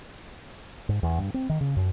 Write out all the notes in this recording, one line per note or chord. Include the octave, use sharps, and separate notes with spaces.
G#2
E2
G2
C4
D#3
C#3
F#2